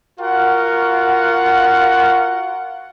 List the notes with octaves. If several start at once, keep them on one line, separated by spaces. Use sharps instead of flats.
F4 F#4 A#4 F5 F#5